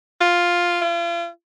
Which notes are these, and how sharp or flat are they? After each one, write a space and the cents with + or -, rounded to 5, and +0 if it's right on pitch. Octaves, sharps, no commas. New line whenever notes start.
F4 +5
F4 -40